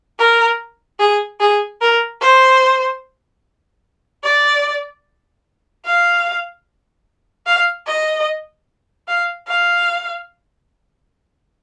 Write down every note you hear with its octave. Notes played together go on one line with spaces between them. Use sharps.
A#4
G#4
G#4
A#4
C5
D5
F5
F5
D#5
F5
F5